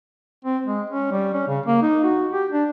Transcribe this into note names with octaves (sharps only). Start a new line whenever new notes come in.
C4
G#3
C#4
G3
C#4
C#3
A#3
D#4
F#4
G4
D4